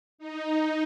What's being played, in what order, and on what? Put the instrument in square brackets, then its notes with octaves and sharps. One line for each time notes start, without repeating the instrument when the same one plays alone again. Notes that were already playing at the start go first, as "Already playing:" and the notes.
[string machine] D#4